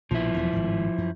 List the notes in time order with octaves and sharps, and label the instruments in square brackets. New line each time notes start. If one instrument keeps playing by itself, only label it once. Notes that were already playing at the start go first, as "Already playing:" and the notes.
[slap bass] A#1 B2 [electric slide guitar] F3 E4
[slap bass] E1 E2 F#3
G#1 A2
F#2